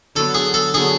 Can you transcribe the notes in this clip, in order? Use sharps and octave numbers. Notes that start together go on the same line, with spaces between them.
D3 F#3 B3 A4
G#4
A4
D3 F#3 B3 G#4